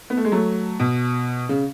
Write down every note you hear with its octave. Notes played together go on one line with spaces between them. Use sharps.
B3
A3
G#3
F#3 A3
B2
C#3